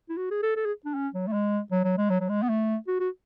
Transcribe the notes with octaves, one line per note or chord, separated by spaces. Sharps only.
E4
F#4
G#4
A4
A4
G#4
D4
C#4
F#3
A3
G#3
F#3
F#3
G#3
F#3
F#3
G#3
B3
A3
F#4
F#4